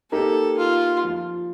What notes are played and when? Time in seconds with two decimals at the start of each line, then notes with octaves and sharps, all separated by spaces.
0.12 A#3 D#4 G4 A4 A#4
0.58 F4
1.04 F3